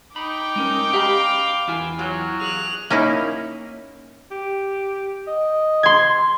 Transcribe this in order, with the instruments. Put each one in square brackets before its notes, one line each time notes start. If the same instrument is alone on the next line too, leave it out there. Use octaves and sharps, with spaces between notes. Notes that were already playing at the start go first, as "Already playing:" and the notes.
[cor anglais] D#4 [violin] G5 D6 [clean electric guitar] B5
[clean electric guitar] G#3 C#4 A#4
[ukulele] G4 A#5 B5 [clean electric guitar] D#5 [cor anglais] F5
[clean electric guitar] E2 E4 G#5 [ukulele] F4 A#4
[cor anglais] F#3 [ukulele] F4 C#5
[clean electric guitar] G#4 [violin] F#6 F7
[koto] A#3 C#4 D#4 E4
[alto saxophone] G4
D#5
[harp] C6 G#6